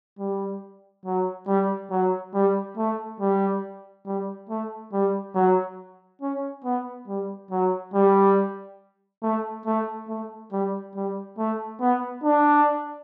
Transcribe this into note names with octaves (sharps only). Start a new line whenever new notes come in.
G3
F#3
G3
F#3
G3
A3
G3
G3
A3
G3
F#3
C#4
B3
G3
F#3
G3
A3
A3
A3
G3
G3
A3
B3
D4